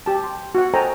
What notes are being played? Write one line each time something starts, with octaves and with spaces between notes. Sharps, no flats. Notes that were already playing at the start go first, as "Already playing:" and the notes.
G4 A5
C6
F#4 F#5
A4 C5 D#5 G5 G#5 A#5